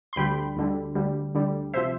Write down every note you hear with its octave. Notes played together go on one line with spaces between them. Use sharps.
C6
D2 D3 G3 G5 B5
D2 D3 G3
D2 D3 G3
D2 D3 G3
C3 F3 C5 E5